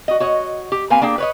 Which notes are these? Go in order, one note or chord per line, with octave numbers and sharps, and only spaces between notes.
F#4 D#5
F#4 C#5 D#5
G4
A#3 C4 B4 F5 G#5
A#3 D4 G#4 G5
B4 C#5 D#5